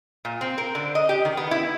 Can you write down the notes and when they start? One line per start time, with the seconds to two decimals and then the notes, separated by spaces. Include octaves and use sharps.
0.25 A#2
0.41 C4
0.58 A#4
0.75 D3
0.95 D#5
1.09 G4
1.25 D#3
1.37 B3
1.51 E4